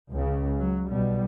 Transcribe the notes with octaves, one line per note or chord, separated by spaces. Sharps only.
C#2 C#3
F#3
B1 B2 G3